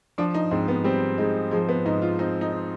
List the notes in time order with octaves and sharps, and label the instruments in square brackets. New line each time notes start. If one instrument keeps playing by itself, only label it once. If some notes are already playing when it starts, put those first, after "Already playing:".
[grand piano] F3 [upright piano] D4
[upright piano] D#4
[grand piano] G#2 [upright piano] C4
[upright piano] B3
[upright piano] G3 [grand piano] C4
[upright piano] G#3 [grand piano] D#4
[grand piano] F3 [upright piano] G#3
[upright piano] B3
[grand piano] G#2 [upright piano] D#4
[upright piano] F4
[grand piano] C4 [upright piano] D#4
[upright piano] D#4
[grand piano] D#4